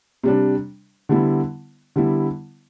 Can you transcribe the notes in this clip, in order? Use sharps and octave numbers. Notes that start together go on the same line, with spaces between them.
C3 G3 D4
D3 G3 B3 E4
D3 G3 B3 E4